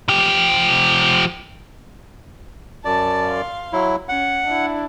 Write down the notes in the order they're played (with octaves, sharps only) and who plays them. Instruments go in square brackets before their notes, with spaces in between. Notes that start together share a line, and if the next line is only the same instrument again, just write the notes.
[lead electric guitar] F3 G4
[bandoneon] F#2 D5 [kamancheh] A5
[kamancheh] F5 C6
[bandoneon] F#3 E4
[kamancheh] C#4 [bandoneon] F#5
[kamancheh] D4 E4